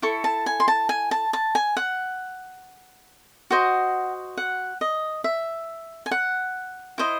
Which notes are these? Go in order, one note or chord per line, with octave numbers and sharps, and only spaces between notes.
E4 A4 C#6
A5
G#5
C6
A5
G#5
A5
A5
G#5
F#5
F#4 C5 D#5
F#5
D#5
E5
G#5
F#5
E4 C5 D#5